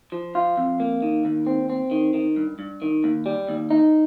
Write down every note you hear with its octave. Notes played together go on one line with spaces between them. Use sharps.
F3
F4
F2
A#3
D#3
D#2
C4
C4
D#3
D#3
G2
G2
D#3
D#2
G3
D#2
D#4